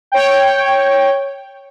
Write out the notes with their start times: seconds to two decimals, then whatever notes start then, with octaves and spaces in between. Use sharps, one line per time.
0.12 C#5 G5